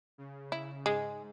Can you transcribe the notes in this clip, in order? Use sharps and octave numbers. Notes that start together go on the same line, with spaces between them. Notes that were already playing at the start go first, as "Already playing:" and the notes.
C#3
E4
G#2 G#3